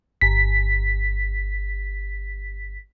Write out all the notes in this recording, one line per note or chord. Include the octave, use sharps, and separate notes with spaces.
G1 B6